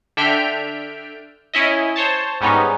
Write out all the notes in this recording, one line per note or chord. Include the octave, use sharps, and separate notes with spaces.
D3 D4 E5 G5 F6 D7
C#4 E4 D#5
C5 C#5 A5
G#2 G3 B3 C#4 D#4